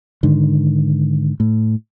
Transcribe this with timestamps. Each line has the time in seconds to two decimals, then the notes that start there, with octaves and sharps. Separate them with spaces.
0.23 G#2 D3 D#3
1.40 A2